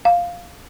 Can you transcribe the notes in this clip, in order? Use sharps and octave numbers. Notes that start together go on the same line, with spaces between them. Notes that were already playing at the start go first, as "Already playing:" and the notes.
F5